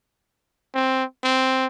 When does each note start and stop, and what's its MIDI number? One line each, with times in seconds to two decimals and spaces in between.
0.74 1.04 60
1.23 1.66 60